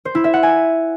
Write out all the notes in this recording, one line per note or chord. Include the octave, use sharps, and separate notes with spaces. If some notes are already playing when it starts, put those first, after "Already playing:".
C5
E4
E5
F#5
G#5